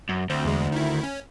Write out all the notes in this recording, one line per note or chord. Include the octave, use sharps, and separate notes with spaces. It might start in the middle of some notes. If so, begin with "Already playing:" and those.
F#2
D2 C4
E2 G#3
D#3 E4
C#4